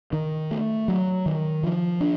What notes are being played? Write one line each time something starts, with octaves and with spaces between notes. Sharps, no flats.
D#3
A3
F#3
D#3
F3
D4